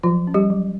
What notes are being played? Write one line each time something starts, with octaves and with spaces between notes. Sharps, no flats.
F3 F#3 F4
C#4
G3 G4
F#3